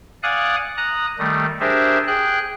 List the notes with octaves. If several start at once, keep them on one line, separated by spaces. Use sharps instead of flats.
D5 F5 F#5 G#5 D#6 F#6
A#5 D#6 F#6
D#3 G3 A3
D4 G4 G#4 A#4 C5 E5
G#4 G5 F#6